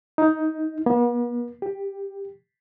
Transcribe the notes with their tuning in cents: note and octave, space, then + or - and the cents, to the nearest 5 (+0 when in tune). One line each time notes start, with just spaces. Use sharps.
D#4 +15
B3 -45
G4 +10